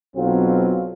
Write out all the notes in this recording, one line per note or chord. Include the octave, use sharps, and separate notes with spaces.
B1 F#3 C4 F4